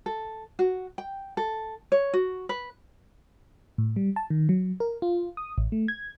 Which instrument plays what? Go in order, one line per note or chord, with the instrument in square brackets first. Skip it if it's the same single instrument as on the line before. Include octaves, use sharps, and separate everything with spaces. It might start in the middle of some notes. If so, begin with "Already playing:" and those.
[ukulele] A4
F#4
G5
A4
C#5
F#4
B4
[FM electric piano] A2
G3
A5
D#3
F#3
A#4
F4
D#6
A1
A3
G#6